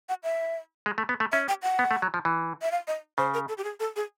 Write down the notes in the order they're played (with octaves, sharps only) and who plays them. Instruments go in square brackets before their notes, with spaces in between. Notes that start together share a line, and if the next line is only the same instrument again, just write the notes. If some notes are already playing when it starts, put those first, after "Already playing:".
[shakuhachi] F#5
E5
[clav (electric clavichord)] G#3
A3
B3
A3
[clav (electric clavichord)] C#4 [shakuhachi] E5
[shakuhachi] G5
F#5
[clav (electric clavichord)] B3
A3
F#3
F3
E3
[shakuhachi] E5
F5
D#5
[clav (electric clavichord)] C#3 [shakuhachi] C5
[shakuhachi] A#4
A4
G4
G#4
A4
G#4